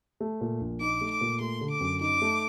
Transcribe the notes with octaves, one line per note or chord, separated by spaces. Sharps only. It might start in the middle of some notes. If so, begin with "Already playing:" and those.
A3
A#2
A#1
D#4 D6
A3
D6
A#2
A3 C6
D3
D6
F#2
D#4 D6
A3